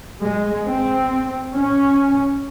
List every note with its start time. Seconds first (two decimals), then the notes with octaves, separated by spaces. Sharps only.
0.23 G#3
0.66 C4
1.53 C#4